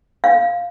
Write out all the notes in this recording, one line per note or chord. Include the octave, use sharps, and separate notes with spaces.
F5